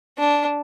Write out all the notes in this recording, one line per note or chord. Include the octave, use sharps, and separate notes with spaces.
D4